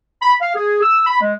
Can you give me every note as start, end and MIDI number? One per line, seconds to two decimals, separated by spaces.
0.22 0.34 83
0.41 0.53 77
0.55 0.79 68
0.82 1.02 88
1.07 1.18 83
1.20 1.33 56